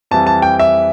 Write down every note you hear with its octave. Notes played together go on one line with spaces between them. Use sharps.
F2 E3 G3 A5
A5
G5
E5